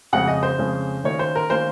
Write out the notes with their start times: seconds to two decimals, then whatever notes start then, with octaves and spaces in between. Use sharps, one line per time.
0.13 F2 C#3 G#3 C#4 F#5
0.27 D#5
0.43 C5
0.59 F2 C#3 G#3 C#4
1.04 D#3 A#3 C#4 C#5
1.19 C5
1.36 A#4
1.50 D#3 A#3 C#4 C5